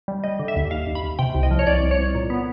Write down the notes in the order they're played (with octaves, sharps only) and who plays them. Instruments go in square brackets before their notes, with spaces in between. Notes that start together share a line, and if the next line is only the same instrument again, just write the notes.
[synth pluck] G3
G3 D#5
D3
E5
D#2
D#2 F5
D#2
B5
D#2
C3 G5
C2
D#5
F3
C#5
C2 D5
C2
C#5
C2
A#2
B3